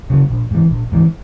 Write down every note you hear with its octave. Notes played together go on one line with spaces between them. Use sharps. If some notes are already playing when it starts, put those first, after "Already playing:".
C#3 F#3
A#1
G#2 E3
A#1
G#2 E3